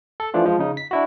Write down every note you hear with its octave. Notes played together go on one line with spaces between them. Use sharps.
A4
E3 F3 A3 D4 F4
F3 G#3
C#3 D#4
B6
D4 E4 F#4